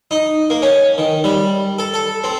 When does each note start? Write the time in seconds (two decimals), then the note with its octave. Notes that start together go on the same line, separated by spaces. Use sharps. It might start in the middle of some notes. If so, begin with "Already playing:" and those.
0.11 D#4
0.50 A#3
0.62 C#4
0.98 D#3
1.24 G3
1.79 A4
1.94 A4
2.24 C4